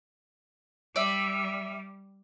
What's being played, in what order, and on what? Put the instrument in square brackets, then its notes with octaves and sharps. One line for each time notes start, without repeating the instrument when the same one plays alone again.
[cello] G3 [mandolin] D5 E5